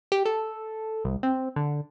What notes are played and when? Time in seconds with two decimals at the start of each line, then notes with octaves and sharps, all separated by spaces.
0.12 G4
0.25 A4
1.04 C2
1.23 C4
1.56 D3